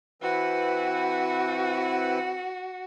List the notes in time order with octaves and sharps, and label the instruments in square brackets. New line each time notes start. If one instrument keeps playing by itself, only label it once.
[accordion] E3 C4 B4 [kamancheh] F#4